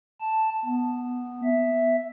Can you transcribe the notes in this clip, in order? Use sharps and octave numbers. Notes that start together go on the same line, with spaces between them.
A5
B3
E5